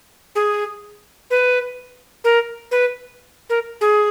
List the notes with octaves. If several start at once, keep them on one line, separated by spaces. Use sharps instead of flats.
G#4
B4
A#4
B4
A#4
G#4